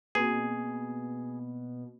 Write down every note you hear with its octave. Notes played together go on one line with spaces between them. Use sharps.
B2 A#3 C4 G#4